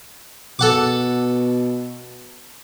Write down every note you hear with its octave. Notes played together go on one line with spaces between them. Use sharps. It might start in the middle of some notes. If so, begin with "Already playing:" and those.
B2 A4 F#5 D6